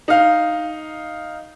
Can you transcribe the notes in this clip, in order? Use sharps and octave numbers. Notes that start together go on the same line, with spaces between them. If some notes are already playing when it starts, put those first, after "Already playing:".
D#4 F5